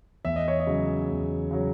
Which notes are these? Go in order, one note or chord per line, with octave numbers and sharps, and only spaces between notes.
E2 E5
D#5
C#5
D#5
C#3 F#3
E2
C#3 F#3